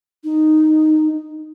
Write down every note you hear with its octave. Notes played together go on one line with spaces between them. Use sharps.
D#4